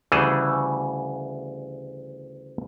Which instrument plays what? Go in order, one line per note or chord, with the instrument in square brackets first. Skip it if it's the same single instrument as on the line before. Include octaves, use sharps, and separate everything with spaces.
[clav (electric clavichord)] D2 C#3 E3 G3 G#4 A4